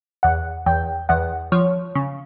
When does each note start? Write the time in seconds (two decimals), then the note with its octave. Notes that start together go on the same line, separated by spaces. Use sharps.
0.23 E2 F#5
0.66 E2 G5
1.09 E2 F#5
1.52 F3 C#5
1.95 C#3